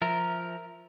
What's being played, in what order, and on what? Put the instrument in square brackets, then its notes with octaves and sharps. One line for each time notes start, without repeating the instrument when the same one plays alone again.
[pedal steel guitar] F3 A#4 [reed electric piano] E5 A#5